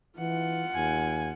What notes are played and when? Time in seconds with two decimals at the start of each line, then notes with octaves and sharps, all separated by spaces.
0.19 E3 F4 F#5
0.75 D#2 G#5